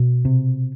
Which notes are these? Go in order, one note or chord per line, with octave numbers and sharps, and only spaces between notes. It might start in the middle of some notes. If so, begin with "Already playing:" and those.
Already playing: B2
C3